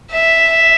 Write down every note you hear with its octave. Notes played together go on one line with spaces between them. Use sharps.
E5